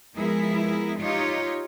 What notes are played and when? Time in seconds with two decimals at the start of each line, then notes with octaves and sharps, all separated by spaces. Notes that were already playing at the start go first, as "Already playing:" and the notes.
0.15 F3 G#3 B3 E4 G#4 A#4
1.00 D#4 F4 G4 C#5